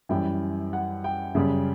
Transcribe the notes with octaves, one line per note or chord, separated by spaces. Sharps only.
F#2 E3 G3 G5
F#5
G5
F#2 C#3 G3